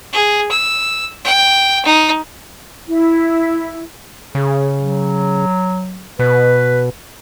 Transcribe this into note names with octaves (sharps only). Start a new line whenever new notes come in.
G#4
E6
G5
D#4
E4
C#3 G#4
F#3
B2 B4